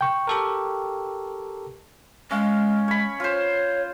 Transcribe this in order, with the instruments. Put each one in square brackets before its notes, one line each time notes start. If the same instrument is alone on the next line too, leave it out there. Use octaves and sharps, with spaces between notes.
[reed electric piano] G5 C#6
[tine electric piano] G4 A4 A#4
[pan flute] G#3 [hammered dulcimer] C#4 F5
[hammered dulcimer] C#5 B5
[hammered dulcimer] F4 C5 [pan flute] C#5